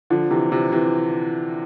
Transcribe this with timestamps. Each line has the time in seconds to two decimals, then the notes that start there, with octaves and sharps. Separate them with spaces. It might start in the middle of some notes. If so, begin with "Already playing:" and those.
0.10 D3 F3
0.31 C3 E3
0.52 C3 E3
0.72 C3 E3